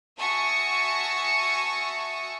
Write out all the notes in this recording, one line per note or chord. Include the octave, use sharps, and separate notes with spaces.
F#4 E5 G#5 A5 C#6 D#6